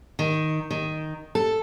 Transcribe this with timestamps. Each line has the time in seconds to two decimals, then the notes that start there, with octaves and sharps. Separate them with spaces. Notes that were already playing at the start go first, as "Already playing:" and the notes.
0.19 D#3
0.71 D#3
1.35 A4